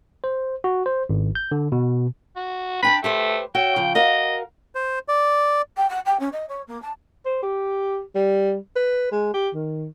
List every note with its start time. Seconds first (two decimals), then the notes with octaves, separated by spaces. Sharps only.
0.24 C5
0.64 F#4
0.86 C5
1.09 G#1
1.35 G6
1.52 D3
1.72 B2
2.36 F#4
2.83 D4 G5 A5 B5
3.04 A3 G4 B4 C5
3.55 F#4 C#5 E5 G5
3.76 C#3 F3
3.95 F#4 A#4 D#5 F5
4.75 C5
5.08 D5
5.77 G5
5.90 F#5
6.06 G5
6.20 C#4
6.32 D#5
6.49 C#5
6.68 A#3
6.82 A5
7.26 C5
7.43 G4
8.15 G3
8.76 B4
9.12 G#3
9.34 G4
9.55 D#3